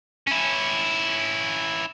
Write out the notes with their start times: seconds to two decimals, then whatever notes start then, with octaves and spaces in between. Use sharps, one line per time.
0.27 C#4 E4